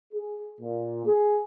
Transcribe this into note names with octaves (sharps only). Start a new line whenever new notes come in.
G#4
A#2
G#4